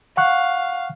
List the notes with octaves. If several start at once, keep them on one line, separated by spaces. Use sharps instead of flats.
F5 F#5 C#6 F#6